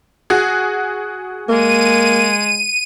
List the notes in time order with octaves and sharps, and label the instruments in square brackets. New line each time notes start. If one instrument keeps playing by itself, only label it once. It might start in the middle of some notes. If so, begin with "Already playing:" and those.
[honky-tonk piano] F#4 G#4
[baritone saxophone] G#3 [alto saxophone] A#3 [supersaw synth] D#7